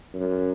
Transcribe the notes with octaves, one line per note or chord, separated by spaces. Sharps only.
F#2